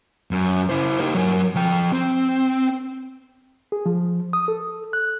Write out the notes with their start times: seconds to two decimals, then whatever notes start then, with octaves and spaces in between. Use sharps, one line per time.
0.31 F#2
0.70 E4 C5
1.00 D#4 G4
1.14 F#3 A#4
1.55 F3 G5
1.93 C4
3.72 G#4
3.86 F3
4.33 D#6
4.48 A4
4.93 F#6